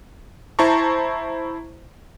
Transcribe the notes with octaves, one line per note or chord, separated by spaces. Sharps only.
E4 C5 A5 A#5 C#6